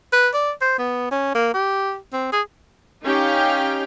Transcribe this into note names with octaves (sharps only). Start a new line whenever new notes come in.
B4
D5
C5
B3
C#4
A#3
G4
C4
G#4
C#4 D#4 G4 F5 G5